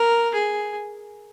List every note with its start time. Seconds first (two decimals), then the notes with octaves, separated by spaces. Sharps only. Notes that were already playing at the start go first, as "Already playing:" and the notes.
Already playing: A#4
0.34 G#4